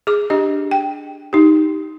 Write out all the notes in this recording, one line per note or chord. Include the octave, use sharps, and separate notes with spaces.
G#4 D6
D4 G4 D#5
G5
D#4 G4